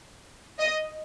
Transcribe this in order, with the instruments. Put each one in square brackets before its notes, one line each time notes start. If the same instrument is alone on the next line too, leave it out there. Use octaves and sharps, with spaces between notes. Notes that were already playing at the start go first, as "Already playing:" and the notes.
[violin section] D#5